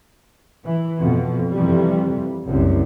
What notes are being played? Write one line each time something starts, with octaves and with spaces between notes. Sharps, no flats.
E3
F2 B2
F2 C3 E3 G3
F#1 C2 F#2